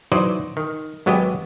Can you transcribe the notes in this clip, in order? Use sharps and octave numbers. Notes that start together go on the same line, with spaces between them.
E3 F#3 D#4 C5 D5 D#5
D#3
G#1 F#3 G#3 B3 G4 D#5